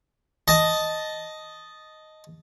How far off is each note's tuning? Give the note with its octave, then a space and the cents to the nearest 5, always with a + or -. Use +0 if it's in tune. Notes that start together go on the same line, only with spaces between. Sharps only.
D#5 +0 A5 -5